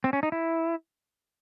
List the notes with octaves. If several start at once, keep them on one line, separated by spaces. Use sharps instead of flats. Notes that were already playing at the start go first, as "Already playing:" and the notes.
C4
C#4
D#4
E4